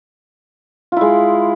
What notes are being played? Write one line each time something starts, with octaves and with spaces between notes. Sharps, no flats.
G#3 E4 F4